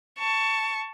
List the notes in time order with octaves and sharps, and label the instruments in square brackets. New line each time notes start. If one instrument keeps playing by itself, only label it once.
[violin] A5 C#6